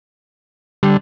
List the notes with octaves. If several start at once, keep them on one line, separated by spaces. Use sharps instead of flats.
D3 G3